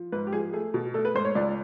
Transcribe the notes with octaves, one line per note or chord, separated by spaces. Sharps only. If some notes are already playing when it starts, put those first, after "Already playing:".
Already playing: F3
G#2 B4
G4
F3 G#4
A3 G#4
B2
A3 A4
B4
G#2 C5
C#5
C#2 D5